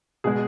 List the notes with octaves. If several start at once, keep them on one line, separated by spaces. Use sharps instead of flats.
B2 G#3 G#4